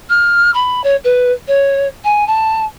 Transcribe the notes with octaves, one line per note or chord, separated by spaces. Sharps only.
F6
B5
C#5
B4
C#5
G#5
A5